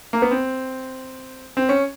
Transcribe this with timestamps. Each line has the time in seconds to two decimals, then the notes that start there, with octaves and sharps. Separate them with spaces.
0.13 A#3
0.22 B3
0.31 C4
1.57 C4
1.69 C#4